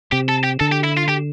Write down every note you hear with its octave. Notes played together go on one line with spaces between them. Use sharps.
C3 G4
A4
G4
D3 A4
G4
E4
F4
G4